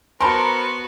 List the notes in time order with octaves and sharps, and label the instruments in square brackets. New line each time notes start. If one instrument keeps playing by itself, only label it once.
[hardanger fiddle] B3 F#4 [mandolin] A#4 C5 [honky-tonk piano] A5 B5 C6